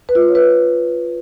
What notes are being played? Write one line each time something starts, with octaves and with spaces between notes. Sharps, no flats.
B4
F4
B4
C#5
B4